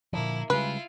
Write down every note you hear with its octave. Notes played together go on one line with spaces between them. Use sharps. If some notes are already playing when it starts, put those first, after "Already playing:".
A#2 D3 F3 A#3 E4
C#3 G3 G#3 E4 F4 B4